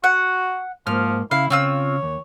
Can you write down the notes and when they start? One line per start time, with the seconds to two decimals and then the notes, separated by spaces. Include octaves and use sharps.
0.04 F#4 F#5
0.87 G#2 F3 A#3 F6
1.31 C#3 E4 F5
1.50 C#3 C4 F4 C#5 E6
2.03 D#2